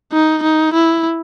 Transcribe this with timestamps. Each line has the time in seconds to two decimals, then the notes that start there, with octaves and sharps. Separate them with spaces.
0.13 D#4
0.43 D#4
0.74 E4